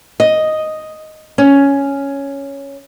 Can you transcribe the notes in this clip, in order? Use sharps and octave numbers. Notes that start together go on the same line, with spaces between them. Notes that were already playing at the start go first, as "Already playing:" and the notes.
D#5
C#4